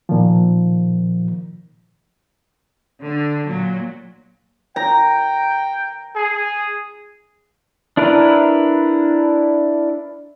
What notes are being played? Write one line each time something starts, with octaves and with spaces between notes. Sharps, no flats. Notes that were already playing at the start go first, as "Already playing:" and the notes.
A#2 D#3 F3
D3
A#2 F#3
G5 A#5
G#4
D4 E4 A#4 B4